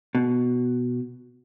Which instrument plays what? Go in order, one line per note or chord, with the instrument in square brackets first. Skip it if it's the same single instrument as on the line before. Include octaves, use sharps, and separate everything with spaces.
[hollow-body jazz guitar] B2